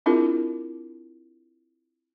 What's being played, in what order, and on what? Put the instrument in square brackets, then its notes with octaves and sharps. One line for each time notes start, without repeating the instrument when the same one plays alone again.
[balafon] C4 D4 E4 F4 G#4 A#4